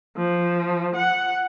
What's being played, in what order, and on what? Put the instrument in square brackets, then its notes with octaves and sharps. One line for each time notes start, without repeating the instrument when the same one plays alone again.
[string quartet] F3
F#5